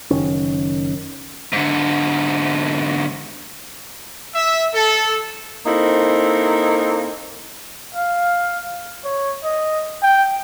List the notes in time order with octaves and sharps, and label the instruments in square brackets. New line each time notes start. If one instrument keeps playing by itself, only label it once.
[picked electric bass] F#1 D#3 C#4
[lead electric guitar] G#2 D3
[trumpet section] E5
A4
[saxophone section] A#3 C4 D#4 E4 A4
[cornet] F5
C#5
D#5
G5